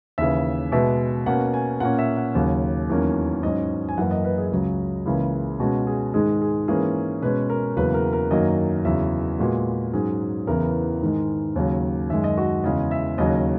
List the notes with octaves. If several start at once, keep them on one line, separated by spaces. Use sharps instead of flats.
D#2 C#3 E3 E5
B2 G#3 B3 E5
B2 A#3 C#4 F#5
G#5
A#2 A#3 C#4 F#5
E5
F#5
D#2 C#3 F#3
E2 D#3 F#3 A#3 C#4
G#2 F#3 C#4 D#5
G#5
F#2 E3 A#3 F#5
D#5
B4
G#4
C#2 C#3 F#3
C#2 C#3 E3 A#3
B2 G#3 C#4 F#4
G#4
G#2 D#3 G#3 G#4
G#4
G#2 E3 A#3 C#4 G#4
B2 G#3 C#4 B4
A#4
E2 C#3 F#3 A#3 B4
A#4
A#4
F#2 D#3 F#3 A#3 D#5
E2 C#3 F#3 E5
A#2 G#3 B3 F#4
G#2 F#3 C#4 G#4
E2 C#3 E3 B3 A#4
G#2 D#3 G#3
D#2 C#3 F#3 C#5
F#2 D#3 G#3 E5
D#5
F#4
E2 C#3 G#3 D#5
E5
D#2 C#3 F#3 D#5